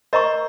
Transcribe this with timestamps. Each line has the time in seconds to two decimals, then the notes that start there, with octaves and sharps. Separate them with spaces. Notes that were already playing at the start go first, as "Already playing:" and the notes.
0.13 A#4 C5 D#5 A#5 C#6